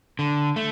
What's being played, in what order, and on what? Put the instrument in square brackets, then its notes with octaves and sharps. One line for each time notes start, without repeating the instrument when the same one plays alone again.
[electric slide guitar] D3
A3